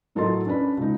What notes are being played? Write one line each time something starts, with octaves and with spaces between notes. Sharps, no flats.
A2 F#3 A4 D#5 C6 A6
C#4 D4 B4 B5
C#2 D#4